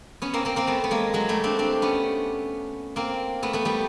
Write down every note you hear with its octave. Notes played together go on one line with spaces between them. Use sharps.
B3 C#4
A#3 C4
A#3 C4
A#3 C4
A3 B3
B3
G#3 A#3
F#3 G#3
G3 A3
C4 D4
C4 D4
B3 C#4
A#3 C4
A3 B3
A3 B3
G3 A3